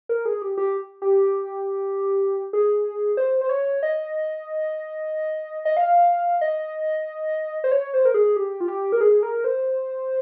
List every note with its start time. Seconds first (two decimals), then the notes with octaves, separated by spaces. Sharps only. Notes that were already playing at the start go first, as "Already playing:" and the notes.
0.09 A#4
0.26 G#4
0.42 G4
0.58 G4
1.02 G4
2.53 G#4
3.17 C5
3.41 C5
3.49 C#5
3.83 D#5
5.65 D#5
5.77 F5
6.41 D#5
7.64 C5
7.71 C#5
7.94 C5
8.05 A#4
8.14 G#4
8.36 G4
8.60 F4
8.68 G4
8.92 A#4
9.01 G#4
9.23 A#4
9.44 C5